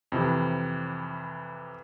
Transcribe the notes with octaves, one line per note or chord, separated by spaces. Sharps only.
F2 C3 E3